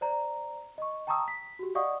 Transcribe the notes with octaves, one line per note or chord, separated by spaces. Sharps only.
C5 D5 A#5
D#5 C#6
G5 A5 A#5 C#6 D#6 E6
B6
F#4 G4
D5 D#5 F5 F#5 C#6 D#6